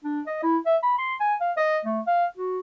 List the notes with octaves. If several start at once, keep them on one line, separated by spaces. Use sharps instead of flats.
D4
D#5
E4
E5
B5
C6
G#5
F5
D#5
A3
F5
F#4